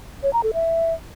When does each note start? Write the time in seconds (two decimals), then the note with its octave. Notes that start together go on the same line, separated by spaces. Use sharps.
0.23 C#5
0.33 A#5
0.43 A4
0.54 E5